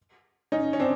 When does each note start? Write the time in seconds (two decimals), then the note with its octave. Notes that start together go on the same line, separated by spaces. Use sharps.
0.52 C#4 D#4
0.73 C#4
0.80 C4 D4